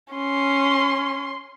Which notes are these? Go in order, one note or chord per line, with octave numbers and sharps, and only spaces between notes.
C#4 C6